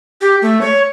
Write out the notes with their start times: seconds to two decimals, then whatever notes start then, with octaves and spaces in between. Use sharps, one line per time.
0.21 G4
0.42 A3
0.61 C#5